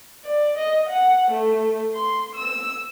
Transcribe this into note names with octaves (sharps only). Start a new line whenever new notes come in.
D5
D#5
F#5
A3
C6
E6